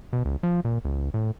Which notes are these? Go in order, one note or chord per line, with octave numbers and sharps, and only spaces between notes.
B2
C#2
F3
A#2
C#2
A2